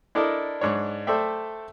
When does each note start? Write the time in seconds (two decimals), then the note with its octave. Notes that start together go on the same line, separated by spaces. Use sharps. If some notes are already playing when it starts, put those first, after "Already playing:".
0.15 D4 E4 A4 A#4 D5 D#5
0.61 G#2 D4 C#5
1.07 A3 A4 C5 D5 E5 G5